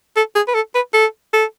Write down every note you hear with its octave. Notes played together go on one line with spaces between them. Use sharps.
A4
G#4
B4
A4
B4
A4
A4